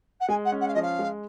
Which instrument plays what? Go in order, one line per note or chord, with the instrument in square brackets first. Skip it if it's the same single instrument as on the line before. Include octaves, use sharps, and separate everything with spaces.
[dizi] F#5
[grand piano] G#3 [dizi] G#5
[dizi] F#5
[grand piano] C#4
[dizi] F#5
F5
[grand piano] F3 [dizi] D#5
[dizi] F5
[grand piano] G#3